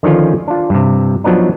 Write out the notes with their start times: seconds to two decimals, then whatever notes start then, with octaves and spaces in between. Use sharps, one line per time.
0.03 D3 D#3 F3 C#4 F4
0.48 D4 F4
0.70 G2 C3
1.24 F3 F#3 B3 D4 D#4